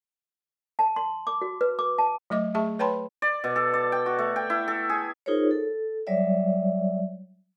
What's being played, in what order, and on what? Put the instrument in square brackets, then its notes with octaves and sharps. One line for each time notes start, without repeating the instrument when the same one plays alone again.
[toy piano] A5
C6
D6
F#4
B4
D6
A5
[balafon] F#3 A3 D#5 D6
A3 G#4 E5 A5 C#6
B4 C#5 G5 A5 B5 C6
[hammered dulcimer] D5
B2
A4
D5
G5
F#4
A3
G5
E4
A4
G#4
[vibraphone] D#4 F4 G#4 A#4 C5 C#5
A4
F#3 G3 C#5 D5 E5